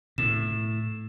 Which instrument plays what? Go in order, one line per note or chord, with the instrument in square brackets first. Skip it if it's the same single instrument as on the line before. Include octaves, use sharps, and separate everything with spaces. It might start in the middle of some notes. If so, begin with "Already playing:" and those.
[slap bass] A2 [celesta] E7